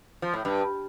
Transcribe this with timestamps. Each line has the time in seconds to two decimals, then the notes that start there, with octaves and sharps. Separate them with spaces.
0.22 F3
0.34 A2
0.45 G2